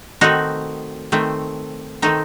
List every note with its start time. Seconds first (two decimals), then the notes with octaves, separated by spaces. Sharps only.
0.21 D#3 A3 C4 D#4 F#4
1.12 D#3 A3 C4
2.02 D#3 A3 C4 D#4